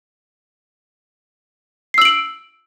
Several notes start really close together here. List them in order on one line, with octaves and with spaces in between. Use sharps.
C7 E6 F#7 D7